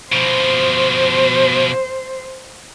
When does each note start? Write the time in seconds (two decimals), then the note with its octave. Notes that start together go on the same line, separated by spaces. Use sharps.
0.13 B2 F3 C5